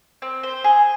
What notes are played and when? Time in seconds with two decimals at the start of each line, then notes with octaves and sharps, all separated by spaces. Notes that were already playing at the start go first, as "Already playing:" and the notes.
0.22 C4
0.43 C5
0.64 G#4